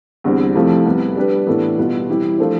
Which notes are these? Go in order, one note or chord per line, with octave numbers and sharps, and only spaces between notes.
E2 D3 G3 C4
F2 C3 F3 A3 E4
C3 G3 B3
G3 D4 G4 B4
A2 E3 B3 D4 A4
B2 G3 B3 F4
E3 G3 C4 E4 G4
F3 A3 D4 A4 C5